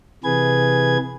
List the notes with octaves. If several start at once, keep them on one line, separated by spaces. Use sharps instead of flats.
C3 E3 G#4 B4 G#6